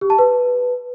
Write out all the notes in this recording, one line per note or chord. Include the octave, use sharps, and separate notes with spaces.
G4
A5
B4